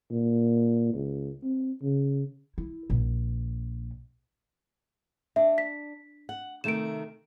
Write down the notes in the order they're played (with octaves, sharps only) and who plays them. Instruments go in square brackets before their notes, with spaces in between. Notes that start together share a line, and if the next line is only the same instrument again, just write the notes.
[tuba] A#2
C#2
C4
C#3
[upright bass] E4
A#1
[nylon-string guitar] D4 [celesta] E5
[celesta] B6
[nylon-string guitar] F#5
[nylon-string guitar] C3 D#3 A3 [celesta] D7 E7